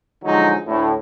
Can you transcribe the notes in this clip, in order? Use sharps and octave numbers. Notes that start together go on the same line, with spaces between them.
D3 F3 F#3 G#3 D#4
D2 A2